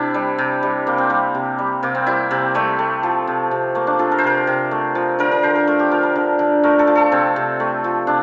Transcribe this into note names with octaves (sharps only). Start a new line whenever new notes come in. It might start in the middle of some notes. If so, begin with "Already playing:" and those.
Already playing: C3 D4 E4
G3
C3
G3
C3 A#3
C4
G3 A#3
C3
G3
C3 A#3
C4
G3 E4
C3 C4
G3 A3
A3
F3
C3
C3
A3 A#3
D4
F3 A4
A#4
C5
C3 A#4
C3
A3
F3
D3 A#4
A#4
D3 C5
A#4
A3 A#4
G4
F3 A#4
A#4
D3
D3
A3 A#4
A4
F3
A4
C3 C4
C3
A3
F3
C3 D4